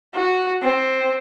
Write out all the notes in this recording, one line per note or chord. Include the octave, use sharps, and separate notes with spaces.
F#4
C4